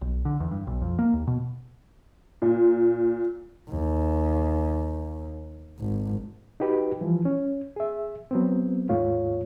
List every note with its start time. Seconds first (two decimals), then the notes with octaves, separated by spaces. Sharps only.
0.01 B1
0.25 D3
0.40 E2
0.51 G2
0.67 B1
0.82 F2
0.99 A#3
1.13 D#2
1.27 B2
2.42 A#2
3.70 D#2
5.80 G#1
6.60 D#4 F#4 G4 B4
7.01 E3 F3 G3
7.25 C#4
7.76 G#4 E5
8.31 F#3 B3 C4
8.89 D#2 G#2 A3 F4 C#5 F5